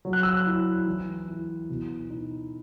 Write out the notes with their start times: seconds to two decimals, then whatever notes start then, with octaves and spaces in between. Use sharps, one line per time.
0.05 F#3
0.13 F#6
0.23 E6
0.33 F#6
0.46 E4
0.87 E3
1.28 E4
1.69 B2
2.10 D#4